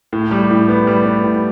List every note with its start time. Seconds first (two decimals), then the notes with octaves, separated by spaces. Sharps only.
0.13 A2
0.31 G3
0.51 A2
0.69 B3
0.87 G3
1.05 B3
1.24 A2